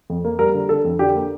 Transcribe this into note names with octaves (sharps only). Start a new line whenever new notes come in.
F2
A#3
G3 A#4
D3
D3 A4
F2
D3 G4
A#3